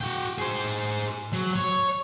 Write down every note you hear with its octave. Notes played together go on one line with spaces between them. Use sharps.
F#4 G5
G#4 C5
F#3
C#5